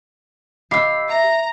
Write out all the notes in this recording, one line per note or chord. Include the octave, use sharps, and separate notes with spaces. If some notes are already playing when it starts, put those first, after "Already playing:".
G4 D#5 F5 B5 E6 C7
E5 A#5